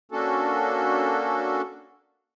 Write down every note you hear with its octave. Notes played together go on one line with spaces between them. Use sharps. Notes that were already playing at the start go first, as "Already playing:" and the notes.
A#3 C#4 D4 F#4 A4